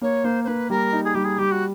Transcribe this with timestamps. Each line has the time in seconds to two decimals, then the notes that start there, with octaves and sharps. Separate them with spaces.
0.01 A#3 C#5
0.24 A#3 C5
0.43 C5
0.47 A#3 B4
0.70 G3 A#4
0.93 D#4
1.04 G#4
1.14 G3 G4
1.24 G#4
1.38 G3 G4
1.51 F#4